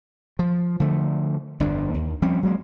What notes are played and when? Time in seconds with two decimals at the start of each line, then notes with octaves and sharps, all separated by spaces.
0.39 F3
0.80 D3 F3 A3
1.60 G1 F2 D4
1.94 D#2
2.22 F3 G3 C4 C#4
2.43 F#3 G#3 A#3